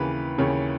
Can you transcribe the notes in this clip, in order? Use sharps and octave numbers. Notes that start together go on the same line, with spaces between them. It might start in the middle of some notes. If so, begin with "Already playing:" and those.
Already playing: D#2 C#3 E3 B4
D#2 C#3 E3 C#5